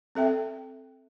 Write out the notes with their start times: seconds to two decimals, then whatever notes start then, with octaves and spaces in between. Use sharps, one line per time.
0.15 C4 A4 E5 G5